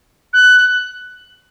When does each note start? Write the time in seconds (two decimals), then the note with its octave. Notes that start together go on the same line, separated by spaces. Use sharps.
0.33 F#6